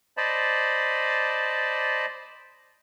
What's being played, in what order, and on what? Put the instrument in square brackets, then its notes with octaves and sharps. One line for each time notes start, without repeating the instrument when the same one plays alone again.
[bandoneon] C5 D5 D#5 A5 B5